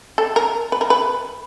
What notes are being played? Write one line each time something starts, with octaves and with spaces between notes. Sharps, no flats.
A4
A#4
B4
A#4
B4